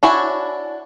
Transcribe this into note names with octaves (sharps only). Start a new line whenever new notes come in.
D4 E4 F#4 C#5 G#5